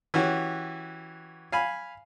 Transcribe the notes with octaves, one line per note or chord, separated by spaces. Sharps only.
E3 C#4 F#4 G4
F5 G#5 B5